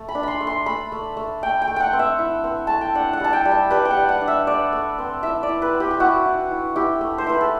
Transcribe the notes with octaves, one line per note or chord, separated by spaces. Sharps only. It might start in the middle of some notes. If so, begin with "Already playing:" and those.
Already playing: A3
B5
D4
B5 C6
A3
C6
A3 B5
A3
A3
A3 G5
G5
A3
F#5 G5
C4
E5
E4
C4
A3 A5
G5
D4 F#5
F#5
G3 A5
G5
G3
A5
G3 B4
G5
F#5
G3
F#5
D4
E5
A3 D5
A3
C4
E4 E5
D5
E4
B4
C4
G4
G4
E4 F#4
E4
E4
E4 G4
A3
C5
E4 B4
A4